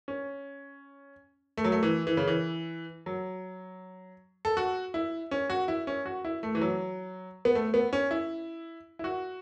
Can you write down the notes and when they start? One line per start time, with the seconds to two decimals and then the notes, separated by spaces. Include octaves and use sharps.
0.08 C#4
1.57 A3
1.64 F#3
1.72 A3
1.83 E3
2.07 E3
2.17 C#3
2.28 E3
3.06 F#3
4.45 A4
4.57 F#4
4.94 E4
5.31 C#4
5.50 F#4
5.68 E4
5.87 C#4
6.06 F#4
6.25 E4
6.43 A3
6.55 E3
6.61 F#3
7.45 B3
7.55 A3
7.74 B3
7.93 C#4
8.11 E4
8.99 E4
9.04 F#4